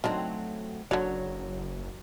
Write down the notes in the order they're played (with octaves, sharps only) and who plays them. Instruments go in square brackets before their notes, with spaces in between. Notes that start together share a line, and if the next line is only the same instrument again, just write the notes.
[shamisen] D#3 D4 [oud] F#3 A3 C4
[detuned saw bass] F#1 [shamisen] D3 D5 [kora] F#3 [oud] C#5